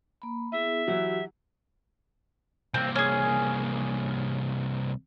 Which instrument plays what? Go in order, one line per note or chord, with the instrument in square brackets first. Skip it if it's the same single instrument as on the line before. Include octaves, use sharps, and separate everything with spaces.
[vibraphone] A#3 B5
[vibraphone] B3 E4 G#4 [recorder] E5
[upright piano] E3 F#3 E4 [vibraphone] G4 F#5
[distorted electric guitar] C2 A#3 [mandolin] C4
[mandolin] C#4 G#4